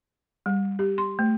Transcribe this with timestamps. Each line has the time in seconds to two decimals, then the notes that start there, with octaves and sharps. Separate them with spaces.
0.46 G3
0.79 G4
0.98 C6
1.19 A3